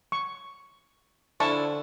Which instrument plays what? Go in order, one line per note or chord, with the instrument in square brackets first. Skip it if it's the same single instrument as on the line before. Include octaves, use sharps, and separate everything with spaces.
[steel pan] C#6
[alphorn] D3 [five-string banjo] F3 D4 E4 [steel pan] A5 C#6